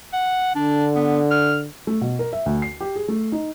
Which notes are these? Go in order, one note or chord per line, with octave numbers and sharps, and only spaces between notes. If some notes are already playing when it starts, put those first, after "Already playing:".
F#5
D3 D4
B3
F6
A3
B2
A#4
E5
D2
C7
G4
G#4
A3
D#4